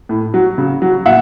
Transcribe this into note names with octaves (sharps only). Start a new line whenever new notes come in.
A2
F#3
C#3
F#3
A#2 E5 F#5